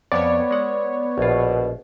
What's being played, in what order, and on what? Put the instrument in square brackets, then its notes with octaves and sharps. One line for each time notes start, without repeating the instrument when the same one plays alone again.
[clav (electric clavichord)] F2 [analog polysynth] B3 C#5 [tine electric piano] D5
[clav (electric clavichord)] G#3 F#5
[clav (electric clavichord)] A#1 F4 [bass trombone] B2